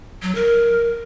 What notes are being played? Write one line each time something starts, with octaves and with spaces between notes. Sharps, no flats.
F#3
A#4